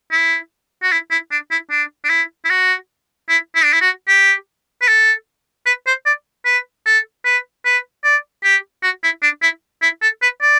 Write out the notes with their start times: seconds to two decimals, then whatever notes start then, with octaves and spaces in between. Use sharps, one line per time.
0.12 E4
0.83 F#4
0.92 E4
1.11 E4
1.31 D4
1.51 E4
1.70 D4
2.04 D4
2.09 E4
2.45 E4
2.50 F#4
3.29 E4
3.56 E4
3.64 D4
3.73 E4
3.82 F#4
4.08 G4
4.82 B4
4.88 A4
5.66 B4
5.87 C5
6.06 D5
6.45 B4
6.86 A4
7.25 B4
7.65 B4
8.04 D5
8.44 G4
8.83 F#4
9.03 E4
9.22 D4
9.43 E4
9.82 E4
10.02 A4
10.22 B4
10.41 D5